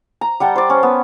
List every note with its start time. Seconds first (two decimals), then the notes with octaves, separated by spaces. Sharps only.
0.21 A#5
0.40 G3 F#5 G5 A5
0.56 C5 D5
0.70 C#4
0.83 B3